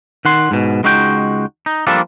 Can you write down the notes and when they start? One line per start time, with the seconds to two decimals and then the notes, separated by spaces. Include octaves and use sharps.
0.25 D#3 F#5 C6
0.51 G#2 B2
0.83 C#2 G#3 D#4 F#4 E5 G5
1.66 D#4
1.87 F3 G3 A#3 D4 A4